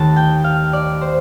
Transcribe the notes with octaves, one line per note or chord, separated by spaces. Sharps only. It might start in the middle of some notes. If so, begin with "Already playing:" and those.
Already playing: D#2 D#3 A3 A5
G5
F5
D5
C5